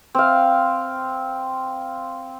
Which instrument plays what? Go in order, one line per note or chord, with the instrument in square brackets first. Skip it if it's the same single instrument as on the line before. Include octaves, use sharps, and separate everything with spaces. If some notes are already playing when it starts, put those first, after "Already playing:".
[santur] C4 F5